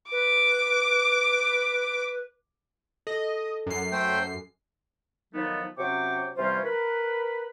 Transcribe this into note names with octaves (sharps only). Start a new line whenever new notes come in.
B4 D6
A4 D#5
F#2 C7
A3 C5 G5
D#3 F3 F#3 A3 B3 D#4
C3 F#3 C#4 G5 C#6 D6
C3 E3 G3 C#4 F4 C5
A#4 B4